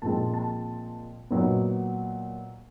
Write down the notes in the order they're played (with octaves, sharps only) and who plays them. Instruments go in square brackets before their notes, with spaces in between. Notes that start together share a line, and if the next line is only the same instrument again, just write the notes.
[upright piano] A#2 F3 G#3 C4 A5
A5
A#2 F#3 B3 D#4